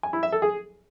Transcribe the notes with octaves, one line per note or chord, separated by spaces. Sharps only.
G#5
E4
E5
A4
G#4